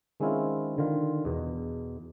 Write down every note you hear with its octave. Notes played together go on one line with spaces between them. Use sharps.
D#3 G#3 C4 C#4 E4 F4
D3 D#3 F4
E2 B2